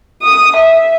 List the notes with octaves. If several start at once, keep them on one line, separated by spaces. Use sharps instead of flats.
D#6
E5